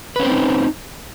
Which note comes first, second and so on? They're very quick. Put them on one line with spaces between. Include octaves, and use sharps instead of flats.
B4 C#4 C5 C4 D#4